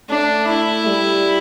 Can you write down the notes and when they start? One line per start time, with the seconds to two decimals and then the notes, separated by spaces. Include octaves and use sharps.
0.10 A3 D4
0.48 E4
0.86 G3